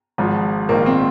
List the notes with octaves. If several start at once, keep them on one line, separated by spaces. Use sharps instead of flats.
G#1 G#2 F3
A#1 G#2 D#3 A#3
C4